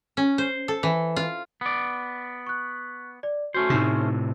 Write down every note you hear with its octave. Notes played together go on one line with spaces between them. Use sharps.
C#4
C5
A4
E3
F4
B3 D5
C#6 F#6
D5
A3 C#4 F#4 C5
A2 C3 D#4